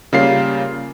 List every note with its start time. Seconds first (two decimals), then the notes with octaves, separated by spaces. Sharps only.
0.13 C#3 G3 A#3 F4 F5 C7